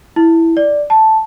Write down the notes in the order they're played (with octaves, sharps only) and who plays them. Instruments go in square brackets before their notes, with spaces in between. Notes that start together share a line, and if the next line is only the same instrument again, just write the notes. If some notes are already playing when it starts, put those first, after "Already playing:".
[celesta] E4
D5
A5